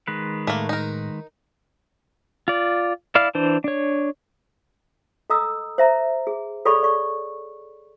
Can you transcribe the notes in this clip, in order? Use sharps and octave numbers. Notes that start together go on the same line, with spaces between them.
D#3 G#3 B4
A2 A3 A#3
D#4 A#4
F4 D5
E4 D5 F5 F6
E3 D4 C5
D4 C#5
A4 D#5 A#5 D#6 E6
C5 E5 A#5
G#4
G#4 A4 C#5 D5 B5 C#6
D5 C#6